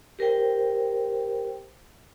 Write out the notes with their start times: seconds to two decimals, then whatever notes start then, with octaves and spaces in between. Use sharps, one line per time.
0.19 G4 A#4 C5 G5